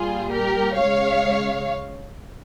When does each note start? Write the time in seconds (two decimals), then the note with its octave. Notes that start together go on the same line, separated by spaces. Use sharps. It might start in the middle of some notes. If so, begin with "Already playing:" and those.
Already playing: A#2 G3 F4 G#4
0.32 G4 A#4
0.76 C#3 G#3 C#5 F5